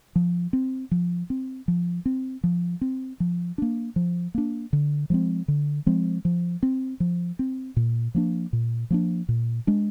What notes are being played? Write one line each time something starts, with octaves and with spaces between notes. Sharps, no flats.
F3
C4
F3
C4
F3
C4
F3
C4
F3
A#3 D4
F3
A#3 D4
D3
F3 G#3 C4
D3
F3 G#3 C4
F3
C4
F3
C4
A#2
F3 A#3 D4
A#2
F3 A#3 D4
A#2
G#3 D4